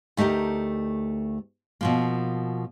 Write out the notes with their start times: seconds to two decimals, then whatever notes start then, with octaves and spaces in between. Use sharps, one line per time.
0.17 D2 A3 D#4 G4 A#4
1.81 B2 F3 A#3